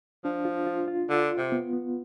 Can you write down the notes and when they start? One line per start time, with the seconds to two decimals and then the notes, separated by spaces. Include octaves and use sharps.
0.25 F3 D4
0.45 F4
0.67 F4
0.88 F4
1.09 D3 F4
1.31 F4
1.37 C3
1.52 B3
1.73 B3